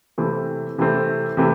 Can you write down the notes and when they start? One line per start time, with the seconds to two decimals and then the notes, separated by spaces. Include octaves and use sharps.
0.18 C3 E3 A3 C4
0.78 C3 E3 A3 C4
1.37 C3 E3 A3 C4